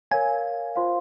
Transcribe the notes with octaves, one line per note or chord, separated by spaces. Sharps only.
A#4 C#5 F5 G#5
F4 C5 F5 C6